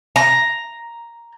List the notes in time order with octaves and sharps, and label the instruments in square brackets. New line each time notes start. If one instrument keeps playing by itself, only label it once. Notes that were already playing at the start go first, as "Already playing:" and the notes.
[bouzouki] A#5